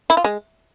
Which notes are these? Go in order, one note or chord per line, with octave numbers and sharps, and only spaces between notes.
E4
F4
G#3